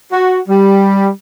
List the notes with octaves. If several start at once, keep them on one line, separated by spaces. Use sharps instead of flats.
F#4
G3